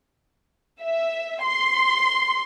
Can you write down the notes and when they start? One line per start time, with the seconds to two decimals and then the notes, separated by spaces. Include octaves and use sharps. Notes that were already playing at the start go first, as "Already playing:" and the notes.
0.83 E5
1.44 C6